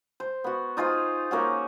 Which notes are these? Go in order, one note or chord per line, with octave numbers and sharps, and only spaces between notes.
C5
B3 F#4
D#4 F4 G#4 C5
A#3 C#4 F#4